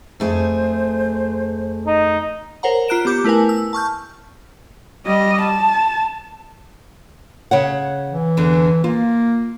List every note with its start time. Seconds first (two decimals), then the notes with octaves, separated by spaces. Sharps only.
0.20 F2 A3 G#4 C5
1.87 D#4
2.63 A#4 C5 C#5 F#5 A#5
2.88 F4 A#5 F#6 D7 E7
3.05 B3 G4 D6 G6
3.24 A3 E4 A#4 B4 G#5
3.49 E6
3.73 A5 C#6 F6 G6
5.05 G3 D#5
5.40 A5
7.51 C#3 C#5 F#5
8.10 E3
8.37 E2 D3
8.84 A#3 F4